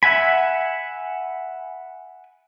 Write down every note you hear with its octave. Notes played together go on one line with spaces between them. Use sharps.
E5 F#5 G#5 B5